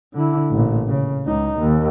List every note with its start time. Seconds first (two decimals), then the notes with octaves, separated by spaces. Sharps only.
0.14 D3 E4
0.51 A1 A#2
0.88 C#3
1.26 C#2 D#4
1.59 D#2